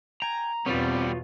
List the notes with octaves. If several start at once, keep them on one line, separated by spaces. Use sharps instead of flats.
G5 G#5 A#5
E2 B2 G3 B3 C4 F4 B4 C#5